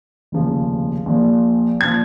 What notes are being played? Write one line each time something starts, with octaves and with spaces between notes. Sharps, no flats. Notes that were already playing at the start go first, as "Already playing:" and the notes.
F1 D#2 C#3 F3
A#1 A#2 F3
A#2 F3 G#6